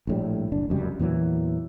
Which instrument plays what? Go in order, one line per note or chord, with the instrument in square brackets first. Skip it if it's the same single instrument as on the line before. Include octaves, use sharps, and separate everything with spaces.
[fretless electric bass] A#1 A2 G3
F#1 D4
F1 C#2 F#2 G3
E2 A#2 E3 F#3